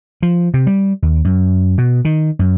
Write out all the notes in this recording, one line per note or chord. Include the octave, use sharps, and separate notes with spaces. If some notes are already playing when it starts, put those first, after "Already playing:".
F3
C3
G3
D#2
F#2
B2
D#3
F#2